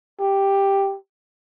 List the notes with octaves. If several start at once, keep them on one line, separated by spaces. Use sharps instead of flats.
G4